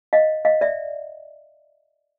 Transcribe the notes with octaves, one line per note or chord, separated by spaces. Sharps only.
D#5 F5
D#5 F5
D5 E5